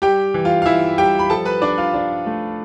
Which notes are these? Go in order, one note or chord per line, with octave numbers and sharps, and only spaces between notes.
G3 G4 G5
E3
F4 F5
F5
E3 E4 E5
G3 G4 G5
B5
F3 A4 A5
B4 B5
D4 D5
F4 F5
D4
A3